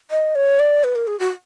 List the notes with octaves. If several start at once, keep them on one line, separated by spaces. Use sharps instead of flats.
D#5
C#5
D5
B4
A#4
G#4
F#4